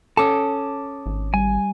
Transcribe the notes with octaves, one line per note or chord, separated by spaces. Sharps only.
C#4 A4 A5 D6 D#6
G#1
G3 G#5